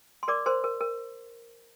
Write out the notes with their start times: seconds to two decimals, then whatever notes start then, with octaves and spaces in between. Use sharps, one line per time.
0.23 C6
0.28 A#4 D5 D6
0.46 A#4 C5 C6
0.64 A#4
0.81 A#4